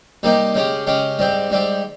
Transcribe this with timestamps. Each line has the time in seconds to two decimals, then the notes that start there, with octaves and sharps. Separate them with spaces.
0.23 C3 G3 A#3 D#4 G4
0.55 C#3 G#3 C#4 G4
0.87 C#3 G#3 C#4 G4
1.19 G#2 G3 C4 G4
1.50 G#2 G3 C4 G4